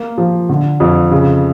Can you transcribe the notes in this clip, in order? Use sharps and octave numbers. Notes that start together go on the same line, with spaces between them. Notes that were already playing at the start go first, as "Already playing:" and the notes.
Already playing: A#3
F3
D3
F2
C#3